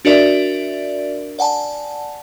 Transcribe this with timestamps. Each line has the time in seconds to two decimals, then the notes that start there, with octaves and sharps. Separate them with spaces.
0.05 D4 F#4 A#4 D5 E5
1.39 D5 F#5 G#5 A5